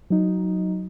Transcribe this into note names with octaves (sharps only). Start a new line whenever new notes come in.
F#3 D#4